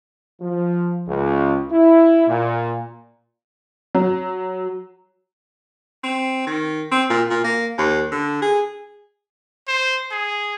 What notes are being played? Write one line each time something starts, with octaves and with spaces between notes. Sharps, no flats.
F3
C#2
E4
A#2
F#3
C4
D#3
C4
A#2
A#2
A#3
D#2
D3
G#4
C5
G#4